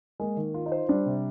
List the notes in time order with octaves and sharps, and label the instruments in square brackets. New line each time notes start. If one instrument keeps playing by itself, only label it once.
[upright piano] G#3 [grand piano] A#3
[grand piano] D#3
F4
[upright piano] D#4
[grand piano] C5
[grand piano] G3 [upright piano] D4
[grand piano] C3